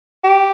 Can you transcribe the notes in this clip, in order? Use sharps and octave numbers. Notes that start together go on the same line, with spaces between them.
G4